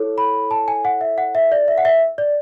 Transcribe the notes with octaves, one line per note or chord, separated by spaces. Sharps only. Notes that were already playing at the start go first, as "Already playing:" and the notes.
Already playing: E4 A4 C#5
B5
A5
G#5
F#5
E5
F#5
E5
D5
E5
F#5
E5
D5